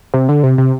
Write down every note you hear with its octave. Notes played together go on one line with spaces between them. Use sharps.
C3
D3
C3
C3